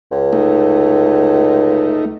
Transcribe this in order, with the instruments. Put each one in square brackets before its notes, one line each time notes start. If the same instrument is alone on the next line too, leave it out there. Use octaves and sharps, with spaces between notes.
[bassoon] C#2
[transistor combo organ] A3 D#4